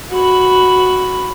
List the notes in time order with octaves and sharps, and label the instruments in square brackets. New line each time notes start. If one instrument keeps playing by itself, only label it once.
[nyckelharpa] F#4 B5